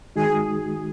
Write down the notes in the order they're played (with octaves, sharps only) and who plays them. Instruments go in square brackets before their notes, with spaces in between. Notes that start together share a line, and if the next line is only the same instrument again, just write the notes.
[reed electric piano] D#3 G#3 D#4 F#4 [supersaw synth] G#4